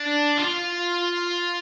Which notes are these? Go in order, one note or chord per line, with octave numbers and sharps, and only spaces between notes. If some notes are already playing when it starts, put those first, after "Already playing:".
Already playing: D4
F4